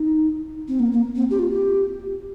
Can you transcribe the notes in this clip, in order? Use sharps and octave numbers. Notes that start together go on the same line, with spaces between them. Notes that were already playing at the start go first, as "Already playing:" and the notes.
Already playing: D#4
C4
A#3
A#3
C4
G4
F4
G4